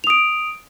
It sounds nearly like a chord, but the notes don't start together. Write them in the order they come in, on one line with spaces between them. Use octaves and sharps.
F7 D#6 D7